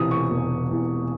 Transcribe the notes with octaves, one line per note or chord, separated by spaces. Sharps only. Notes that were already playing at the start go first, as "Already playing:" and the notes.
Already playing: E1 E2 C3 E3 D#6
C#6
E1
E2 C3 E3